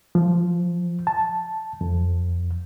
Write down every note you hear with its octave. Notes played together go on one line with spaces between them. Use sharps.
F3
A5
F2